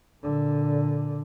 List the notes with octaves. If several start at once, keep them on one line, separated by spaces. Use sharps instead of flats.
A#2 D3